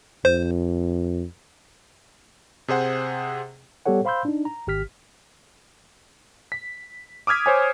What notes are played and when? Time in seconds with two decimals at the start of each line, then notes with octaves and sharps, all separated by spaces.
0.25 F2 C5
2.68 C3 G#4 C5 F#5
3.86 G3 B3 G4 A4 C#5 F#5
4.05 C5 F5 B5 C6 E6 G6
4.25 D4 D#4
4.45 A#5
4.67 G#1 G4 F6 B6
6.52 B6
7.27 D6 D#6 F6 G#6 B6
7.46 C5 C#5 G#5